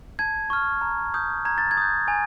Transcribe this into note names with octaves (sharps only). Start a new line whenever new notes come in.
A5 G#6
C#6 F6
A#5
D#6 G6
A#5 G#6
A6
G#6
D#6 G6
G#5